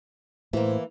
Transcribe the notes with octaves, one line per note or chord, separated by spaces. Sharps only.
A2 E3 A#3 C5